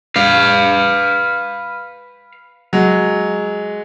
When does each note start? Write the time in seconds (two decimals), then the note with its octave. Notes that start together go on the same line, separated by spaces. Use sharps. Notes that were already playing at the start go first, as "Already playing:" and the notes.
0.16 B4 F5
2.73 F#3 G#3